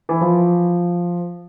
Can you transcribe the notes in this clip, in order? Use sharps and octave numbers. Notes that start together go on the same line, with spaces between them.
E3
F3